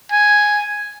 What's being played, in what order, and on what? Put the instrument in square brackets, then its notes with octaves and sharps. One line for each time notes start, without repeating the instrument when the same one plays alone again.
[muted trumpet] G#5